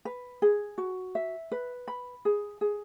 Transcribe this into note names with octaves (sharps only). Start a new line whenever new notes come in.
B4
G#4
F#4
E5
B4
B5
G#4
G#4